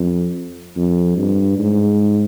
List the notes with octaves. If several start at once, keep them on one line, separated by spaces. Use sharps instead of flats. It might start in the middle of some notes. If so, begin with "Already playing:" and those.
Already playing: F2
F2
G2
G#2